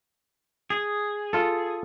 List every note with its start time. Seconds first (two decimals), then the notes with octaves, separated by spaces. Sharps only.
0.70 G#4
1.33 F4 A4